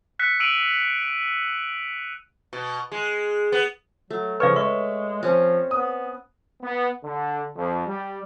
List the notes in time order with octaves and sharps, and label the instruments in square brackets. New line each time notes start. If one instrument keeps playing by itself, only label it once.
[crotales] E6 F#6 B6 C#7
E6 D7 D#7 F7 F#7
[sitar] B2
G#3
B3
[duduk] F#3 [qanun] A3
[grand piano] C#3 C#5 C#6 [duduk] F3 [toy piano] B4 D5 F5
[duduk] G#3 [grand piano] C#5 E5 [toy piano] C#6
[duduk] F3 [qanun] C4 C#4
[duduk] B3 [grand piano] D#6
[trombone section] B3
D3
F2
G3